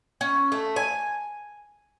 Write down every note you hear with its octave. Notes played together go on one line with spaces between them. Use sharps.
C#4
A3
G#5